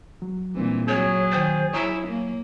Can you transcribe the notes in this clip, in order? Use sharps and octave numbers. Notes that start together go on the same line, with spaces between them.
F#3
A#2 E3 G3 C4 D4
F#3 G#4 C#5
D#3 C5 G5 A6
F#3 E4 C#5 G#5
A#3